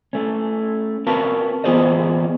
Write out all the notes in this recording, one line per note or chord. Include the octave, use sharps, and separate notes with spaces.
A3 C#4
C4 F#4 A#4 B4 F5 A5
E3 B3 F4 G#4 C5 D#5